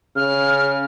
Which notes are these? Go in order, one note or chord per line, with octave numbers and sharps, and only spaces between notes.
C#3 F6